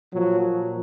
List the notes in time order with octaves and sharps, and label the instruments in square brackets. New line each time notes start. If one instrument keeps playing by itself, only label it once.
[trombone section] A#2 F3 F#3